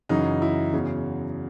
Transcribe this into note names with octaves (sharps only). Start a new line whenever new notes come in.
F#2 C#3 E3 D#4
E4
E2 C#3 F#3